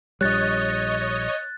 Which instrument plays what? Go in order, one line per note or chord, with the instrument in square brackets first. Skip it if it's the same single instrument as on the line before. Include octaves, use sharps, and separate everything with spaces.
[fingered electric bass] A#1 G3 [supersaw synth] C#5 D#5 [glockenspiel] F#6 A6